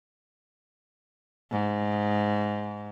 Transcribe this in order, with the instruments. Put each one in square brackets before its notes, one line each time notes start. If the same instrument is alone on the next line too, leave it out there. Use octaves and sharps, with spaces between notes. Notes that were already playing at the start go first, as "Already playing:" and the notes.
[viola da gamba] G#2